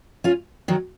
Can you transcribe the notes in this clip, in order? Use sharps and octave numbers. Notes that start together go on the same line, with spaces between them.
C#4 F4
D#3 F#3